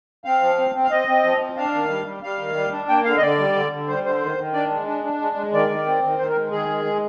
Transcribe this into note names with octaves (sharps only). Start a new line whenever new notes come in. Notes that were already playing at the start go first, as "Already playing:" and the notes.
C4 F5
F3
C4
C4
F5
C4 D#5
C4
F3
C4
D4 F5
D#3
G3
G3
G3 F5
D#3
G3
D4
A#3 G5
D3 F5
D#5
D3 D5
G3
D3
D3
G3 C5
D3 C5
D#3
D#3
D4 D5
G#3
D4
D4
G#3
G#3
D#3 D5
D#3
C4
D#3
D#3 C5
A#4
G#3
D#3 G#4
G#3
G#3